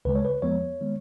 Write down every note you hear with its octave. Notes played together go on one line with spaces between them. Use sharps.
C#2 C#3 G#3 B4
C#5
B4
F2 F3 G#3 B3 C#5
D#3 G#3 B3